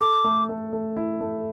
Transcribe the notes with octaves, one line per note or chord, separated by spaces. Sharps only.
A4 D6
A3
A3
A3
E4
A3